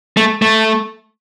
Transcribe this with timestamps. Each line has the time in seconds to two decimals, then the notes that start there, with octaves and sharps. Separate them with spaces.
0.17 A3
0.42 A3